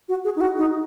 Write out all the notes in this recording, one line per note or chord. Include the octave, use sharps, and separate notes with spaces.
F#4
G#4
D#4
F#4
D#4